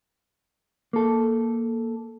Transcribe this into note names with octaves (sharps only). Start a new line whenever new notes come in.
A#3 A4